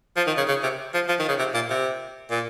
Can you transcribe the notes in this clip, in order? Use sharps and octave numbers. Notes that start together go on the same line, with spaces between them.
F3
D#3
C#3
C#3
C3
F3
F3
D#3
C#3
C3
A#2
C3
A#2